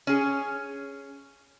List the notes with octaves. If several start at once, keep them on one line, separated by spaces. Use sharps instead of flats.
C#4 G#4